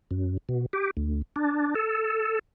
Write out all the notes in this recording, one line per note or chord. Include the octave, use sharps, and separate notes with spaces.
F#2
B2
G4
D2
D4
A4